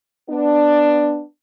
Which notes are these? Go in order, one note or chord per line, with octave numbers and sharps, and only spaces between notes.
B3 D4